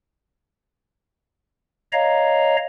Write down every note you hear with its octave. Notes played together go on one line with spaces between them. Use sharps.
C#5 D#5 F5 A#5